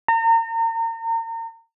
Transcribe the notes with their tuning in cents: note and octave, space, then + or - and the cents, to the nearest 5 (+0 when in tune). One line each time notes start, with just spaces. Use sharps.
A#5 -35